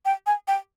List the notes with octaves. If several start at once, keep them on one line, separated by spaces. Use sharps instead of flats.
G5
G#5
G5